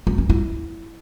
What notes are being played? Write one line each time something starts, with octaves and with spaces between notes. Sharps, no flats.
C#4
C#4
E4